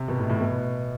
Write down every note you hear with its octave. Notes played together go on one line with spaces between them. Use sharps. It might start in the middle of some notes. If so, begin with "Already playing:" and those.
Already playing: C3
B2
A2
A2
B2